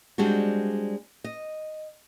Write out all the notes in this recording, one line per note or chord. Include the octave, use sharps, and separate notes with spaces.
G3 G#3 C4 D4 F#4
D#5